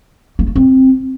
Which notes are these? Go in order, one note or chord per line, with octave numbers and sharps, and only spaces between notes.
A#3
A3
C4